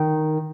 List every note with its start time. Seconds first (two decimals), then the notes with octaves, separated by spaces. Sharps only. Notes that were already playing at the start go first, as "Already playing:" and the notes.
Already playing: D#3